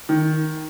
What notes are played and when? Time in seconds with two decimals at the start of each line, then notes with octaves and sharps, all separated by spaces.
0.09 D#3